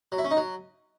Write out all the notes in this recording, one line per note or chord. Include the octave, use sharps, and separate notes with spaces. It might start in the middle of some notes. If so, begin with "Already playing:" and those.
F#3
E4
C#4
D#4
F#3